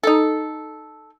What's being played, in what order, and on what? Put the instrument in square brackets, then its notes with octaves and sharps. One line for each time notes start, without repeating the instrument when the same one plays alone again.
[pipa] D#4 A4